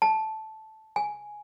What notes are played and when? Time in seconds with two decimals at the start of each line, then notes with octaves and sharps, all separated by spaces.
0.02 A5
0.96 G#5